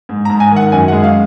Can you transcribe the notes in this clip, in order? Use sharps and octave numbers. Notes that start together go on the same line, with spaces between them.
G#2
A#5
G#2
G#5
D#3
F#5
F#2 G#5
F#5
G#3
F5